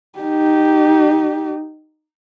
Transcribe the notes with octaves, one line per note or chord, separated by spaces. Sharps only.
D#4 G4